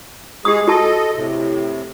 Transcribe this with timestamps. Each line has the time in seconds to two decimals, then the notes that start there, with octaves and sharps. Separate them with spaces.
0.45 G#3 G4 G#4 D#6
0.67 F#4 A4 D#5 A5
1.14 A2 C3